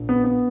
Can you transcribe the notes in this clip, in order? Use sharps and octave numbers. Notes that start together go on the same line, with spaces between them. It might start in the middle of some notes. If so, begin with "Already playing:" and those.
Already playing: A#1 A#2
B3
B3